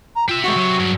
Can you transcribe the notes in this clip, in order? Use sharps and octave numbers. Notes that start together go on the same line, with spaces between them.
A#5
F4 G4 E5
G#3 F#4 C#6
F#3
G2 G#4